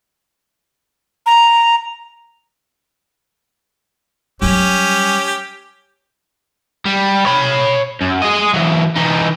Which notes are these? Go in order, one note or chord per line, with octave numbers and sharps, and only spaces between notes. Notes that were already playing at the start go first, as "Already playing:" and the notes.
A#5
F#3 G3 C#4 G4
G3
C#5 B5
F#2
G#4 D#5
E3 F#3
E3 D#4